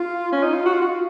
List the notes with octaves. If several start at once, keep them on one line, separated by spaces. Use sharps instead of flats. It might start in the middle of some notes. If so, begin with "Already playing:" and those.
Already playing: F4
C#4
D#4
F4
F#4
F4
F#4
F4